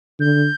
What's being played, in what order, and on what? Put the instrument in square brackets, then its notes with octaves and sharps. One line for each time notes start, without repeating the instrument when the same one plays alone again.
[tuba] D3 [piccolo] G6